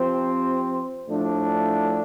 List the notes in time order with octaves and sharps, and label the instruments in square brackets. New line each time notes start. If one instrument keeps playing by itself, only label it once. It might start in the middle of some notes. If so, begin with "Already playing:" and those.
Already playing: [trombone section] F3 C4 G4 C5
A2 F3 A3 D4